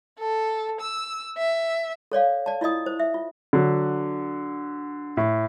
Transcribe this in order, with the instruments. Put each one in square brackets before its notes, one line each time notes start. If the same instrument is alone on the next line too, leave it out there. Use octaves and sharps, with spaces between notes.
[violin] A4
E6
E5
[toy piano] A4 C#5 D5 F5
D5 A5
E4 F4 D5 D#5 D#6
C5
E5
F4
[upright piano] D3 F#3
A2